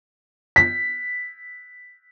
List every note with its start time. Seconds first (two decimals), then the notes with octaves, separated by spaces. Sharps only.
0.56 B6